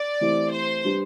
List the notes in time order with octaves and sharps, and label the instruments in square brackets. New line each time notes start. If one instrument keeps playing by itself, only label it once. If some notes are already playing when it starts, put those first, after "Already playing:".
Already playing: [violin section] D5
[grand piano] E3 A3 C4 E4 G4
[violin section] C5
[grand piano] G3 D4 G4 B4